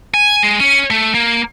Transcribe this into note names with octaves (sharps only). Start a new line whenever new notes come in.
G#5
G#3
C#4
A3
A#3